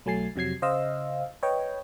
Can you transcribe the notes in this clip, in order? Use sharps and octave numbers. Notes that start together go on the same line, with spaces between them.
B1 F#3 A3 G#5 A6 C7
F2 C3 F#3 G#6 C7
C#3 C5 D#5 F5 E6
B4 C#5 D#5 G5